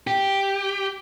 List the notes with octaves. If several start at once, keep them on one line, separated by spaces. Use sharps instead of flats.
G4